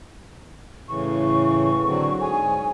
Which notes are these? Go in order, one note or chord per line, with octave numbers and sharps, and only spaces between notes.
A2 C#3 E3 C#6
D3 F#3 C4
G#2 G#4 C#5 G#5